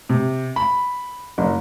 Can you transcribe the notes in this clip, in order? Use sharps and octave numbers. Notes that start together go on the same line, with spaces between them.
C3
B5
F#1